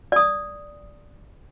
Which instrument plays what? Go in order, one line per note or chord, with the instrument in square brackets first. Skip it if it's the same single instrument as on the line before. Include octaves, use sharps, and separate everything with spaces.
[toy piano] D5 D#6